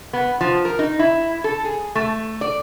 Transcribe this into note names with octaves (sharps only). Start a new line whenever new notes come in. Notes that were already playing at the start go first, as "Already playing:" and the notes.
B3
F3
A#4
D#4
E4
A4
G#4
A3
D5